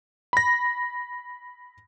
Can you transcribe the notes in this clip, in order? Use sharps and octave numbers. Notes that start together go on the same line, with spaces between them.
B5 A#6